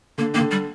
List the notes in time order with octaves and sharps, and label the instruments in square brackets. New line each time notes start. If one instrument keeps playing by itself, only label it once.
[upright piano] D3 [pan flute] A#3
[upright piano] D#3 [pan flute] A#3
[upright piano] D3
[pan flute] G3